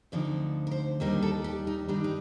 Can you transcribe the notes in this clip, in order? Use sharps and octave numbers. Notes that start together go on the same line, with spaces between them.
D2 D3 F3 C4 D#4 D5
A#4
C5
D#2 D#3 G3 D4 A#4
A4
G4
D#4
G2 D#3 G3 D4 D#4
D#4